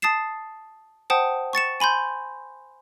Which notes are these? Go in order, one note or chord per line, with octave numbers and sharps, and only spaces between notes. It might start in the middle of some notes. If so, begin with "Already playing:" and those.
A5 D#6 A6 C7 E7
C5 F#5 G5 A5 D#6
C#6 A6 C#7 E7
G#5 B5 C6 G6